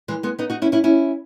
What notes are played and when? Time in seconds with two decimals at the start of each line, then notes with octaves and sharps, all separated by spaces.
0.08 E3 G#3
0.23 G#3 B3
0.39 B3 D#4
0.50 D#4 F#4
0.62 C#4 E4
0.72 C#4 E4
0.84 C#4 E4